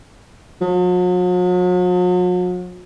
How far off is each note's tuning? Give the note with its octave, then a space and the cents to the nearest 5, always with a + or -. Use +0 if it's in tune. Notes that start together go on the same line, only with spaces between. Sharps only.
F#3 -45